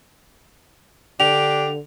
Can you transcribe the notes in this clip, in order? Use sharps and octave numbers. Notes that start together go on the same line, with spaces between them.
D3 D4 G4 F7